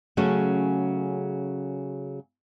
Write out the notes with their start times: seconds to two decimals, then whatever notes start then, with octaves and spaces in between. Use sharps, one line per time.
0.17 C#3 F#3 A3 C#4 G#4